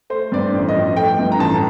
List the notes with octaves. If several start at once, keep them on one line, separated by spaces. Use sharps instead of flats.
A3 C5
G2 D5
C5
A1
D#5
F3
A3 G5
G2
A#5
A1 A5